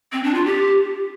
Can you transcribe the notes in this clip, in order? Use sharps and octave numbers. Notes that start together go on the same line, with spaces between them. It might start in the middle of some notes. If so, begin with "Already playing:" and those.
C4
D4
F4
G4